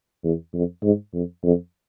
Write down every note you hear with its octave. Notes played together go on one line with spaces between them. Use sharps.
E2
F2
G#2
F2
F2